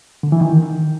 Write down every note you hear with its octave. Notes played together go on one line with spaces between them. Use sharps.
D3
E3
D#3